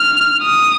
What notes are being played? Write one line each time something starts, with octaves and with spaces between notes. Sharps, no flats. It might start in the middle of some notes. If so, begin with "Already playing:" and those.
Already playing: F6
D#6